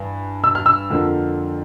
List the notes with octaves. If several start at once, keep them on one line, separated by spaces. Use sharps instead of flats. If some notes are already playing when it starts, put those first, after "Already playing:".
Already playing: G2 E3
E6
F6
E6
F2 D3 F3 A#3